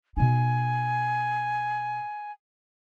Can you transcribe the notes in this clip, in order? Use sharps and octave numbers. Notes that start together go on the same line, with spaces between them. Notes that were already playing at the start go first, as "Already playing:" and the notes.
B2 D#4 G#5